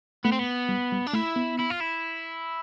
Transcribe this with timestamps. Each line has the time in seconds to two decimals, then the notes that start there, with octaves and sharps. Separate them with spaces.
0.25 A3 B3
0.32 C4
0.39 B3
0.69 G3
0.92 G3
1.06 D4
1.14 A3 E4
1.36 B3
1.59 E4
1.70 F4
1.80 E4